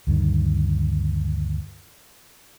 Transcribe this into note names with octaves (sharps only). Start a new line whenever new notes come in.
D2 G2 D#3